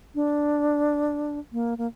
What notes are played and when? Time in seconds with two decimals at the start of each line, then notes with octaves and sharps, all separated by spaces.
0.15 D4
1.53 A#3
1.78 A#3